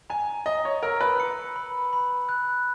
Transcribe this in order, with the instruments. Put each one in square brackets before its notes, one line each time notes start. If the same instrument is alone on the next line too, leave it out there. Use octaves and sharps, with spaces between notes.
[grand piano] G#5 [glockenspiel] A#5
[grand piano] D#5 [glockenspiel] A#5
[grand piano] C#5
[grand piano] A#4 [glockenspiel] E6
[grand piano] B4
[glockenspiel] C#7
B5
B5
F#6